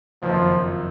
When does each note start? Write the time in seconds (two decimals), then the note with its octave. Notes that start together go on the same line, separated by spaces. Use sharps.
0.22 F#1 F2 D#3 F3